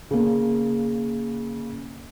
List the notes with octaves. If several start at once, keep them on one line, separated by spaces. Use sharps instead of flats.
C#3 A#3